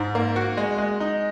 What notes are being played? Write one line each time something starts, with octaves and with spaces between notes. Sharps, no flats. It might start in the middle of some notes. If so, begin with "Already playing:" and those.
Already playing: G#2
A#3
F#4
G#3
G#3
D#4